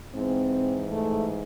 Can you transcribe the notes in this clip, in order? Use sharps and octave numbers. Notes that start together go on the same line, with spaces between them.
G#2 E3 C4
A3